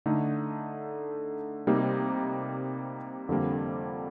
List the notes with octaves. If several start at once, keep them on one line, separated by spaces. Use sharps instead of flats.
D3 A3 D#4
C3 G3 A#3 D#4
F2 D3 G3 A#3